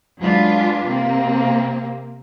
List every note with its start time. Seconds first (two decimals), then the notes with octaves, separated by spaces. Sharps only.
0.20 F#3 G#3 D4 F4 B4
0.87 C3 A#3 C4